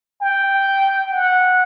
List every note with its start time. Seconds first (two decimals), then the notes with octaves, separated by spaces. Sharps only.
0.21 G5
1.11 F#5